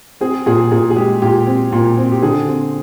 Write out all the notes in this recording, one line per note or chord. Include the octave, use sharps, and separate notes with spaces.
C4 G#4
A#2 G#4
A#2 G#4
G#4
G#3 G4
A#2 G4
C4
A#2
C4
G4
D3 G#4
C4